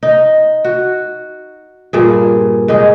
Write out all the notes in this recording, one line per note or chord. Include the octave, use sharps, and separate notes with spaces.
D#4
F#4
G2 A#2 G#4
G#2 D#4 G#4